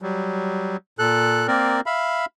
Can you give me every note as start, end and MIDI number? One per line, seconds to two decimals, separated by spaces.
0.02 0.77 54
0.02 0.77 55
0.99 1.47 46
0.99 1.47 69
0.99 1.47 90
1.48 1.81 58
1.48 1.81 60
1.48 1.81 70
1.48 1.81 74
1.86 2.25 76
1.86 2.25 77
1.86 2.25 83